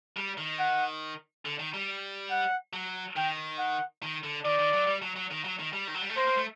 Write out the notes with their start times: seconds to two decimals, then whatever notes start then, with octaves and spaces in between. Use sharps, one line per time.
0.17 G3
0.37 D#3
0.59 F#5
1.45 D3
1.59 D#3
1.74 G3
2.31 F#5
2.73 F#3
3.16 D#3 G5
3.59 F#5
4.02 D#3
4.23 D3
4.45 D#3 D5
4.59 D#3
4.73 F#3
4.87 G3
5.02 F#3
5.16 F#3
5.31 D#3
5.45 F#3
5.59 D#3
5.73 G3
5.87 D#3
5.94 F#3
6.02 G3
6.09 A3
6.16 A#3 C5
6.27 A#3
6.37 A3